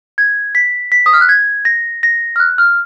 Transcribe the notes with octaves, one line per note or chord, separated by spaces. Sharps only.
G#6
B6
B6
D#6
F6
F#6
G#6
A#6
A#6
F6
F#6
F6